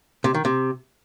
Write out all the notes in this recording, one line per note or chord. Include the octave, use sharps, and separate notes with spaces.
C3
D#3
C3